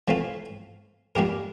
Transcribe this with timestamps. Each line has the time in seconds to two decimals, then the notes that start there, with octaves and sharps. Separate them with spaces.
0.08 E3 A3 C4 F4 A4
1.15 A#2 G3 D4 G4 A#4